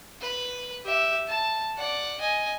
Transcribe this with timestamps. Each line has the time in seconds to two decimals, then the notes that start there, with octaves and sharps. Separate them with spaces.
0.21 B4
0.85 G4 E5
1.28 A5
1.78 D5 F#5
2.20 D#5 G#5